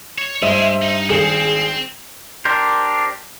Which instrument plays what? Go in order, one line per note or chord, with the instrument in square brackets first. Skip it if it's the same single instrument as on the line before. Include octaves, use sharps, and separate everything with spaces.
[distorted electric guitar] C#5
[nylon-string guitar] G2 [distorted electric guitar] G#3 [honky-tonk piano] C5 D#5 E5
[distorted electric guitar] D#4
[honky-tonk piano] G#1 G#4 C#7 [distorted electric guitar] C4
[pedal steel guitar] D4 G4 A#4 C5